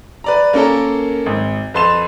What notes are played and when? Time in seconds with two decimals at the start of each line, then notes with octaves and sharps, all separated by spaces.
0.24 B4 D5 A#5
0.53 A#3 C#4 A4 A#4
1.26 G#1
1.74 F2 B4 C6 A6 E7